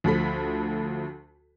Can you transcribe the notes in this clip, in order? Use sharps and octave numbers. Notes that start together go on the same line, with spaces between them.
D2 F3 A4 B5 B6